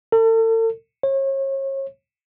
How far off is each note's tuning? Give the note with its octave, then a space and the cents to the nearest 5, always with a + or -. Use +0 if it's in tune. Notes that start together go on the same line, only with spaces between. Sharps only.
A4 +40
C#5 -35